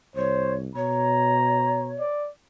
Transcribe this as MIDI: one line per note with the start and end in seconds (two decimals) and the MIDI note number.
0.16 0.69 36
0.16 0.54 72
0.16 0.55 73
0.76 1.99 47
0.76 2.04 73
0.76 1.90 82
1.99 2.30 74